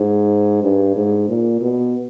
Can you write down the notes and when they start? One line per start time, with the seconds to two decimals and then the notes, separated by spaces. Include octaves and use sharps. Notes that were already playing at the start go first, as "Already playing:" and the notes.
Already playing: G#2
0.63 G2
0.96 G#2
1.29 A#2
1.61 B2